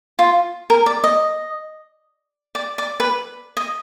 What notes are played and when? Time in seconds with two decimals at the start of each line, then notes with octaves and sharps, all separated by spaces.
0.19 F4
0.70 A#4
0.86 D5
1.04 D#5
2.55 D5
2.78 D5
3.00 B4
3.57 D#5